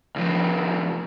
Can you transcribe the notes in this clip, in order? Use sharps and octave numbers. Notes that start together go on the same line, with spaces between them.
C2 F3